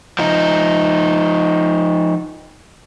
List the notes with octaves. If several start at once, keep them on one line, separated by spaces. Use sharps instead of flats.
F3 D#4